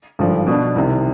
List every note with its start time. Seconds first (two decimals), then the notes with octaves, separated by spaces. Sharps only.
0.19 G#1 G2 D3 F3
0.47 B2 B3 D4
0.76 C2 C3 D#3